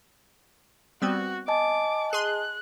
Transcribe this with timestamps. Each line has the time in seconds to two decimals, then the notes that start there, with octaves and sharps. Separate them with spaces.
1.02 G3 B3 C4 F#4
1.48 D#5 G#5 A5 D6
2.13 G#4 C6 F#6